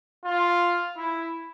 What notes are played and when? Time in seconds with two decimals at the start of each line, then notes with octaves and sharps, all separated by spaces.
0.25 F4
0.97 E4